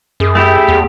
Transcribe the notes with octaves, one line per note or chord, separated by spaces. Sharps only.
F#2 G#4
A3 E4 G4
E2